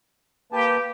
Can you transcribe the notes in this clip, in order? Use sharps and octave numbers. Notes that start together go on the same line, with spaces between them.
A#3 G4 B4 A5